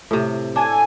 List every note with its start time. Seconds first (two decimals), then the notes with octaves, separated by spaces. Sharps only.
0.11 A2 C3
0.56 D4 A4 G#5